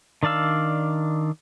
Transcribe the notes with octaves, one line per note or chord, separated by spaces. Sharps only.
D#3 D4 D5 F5 E6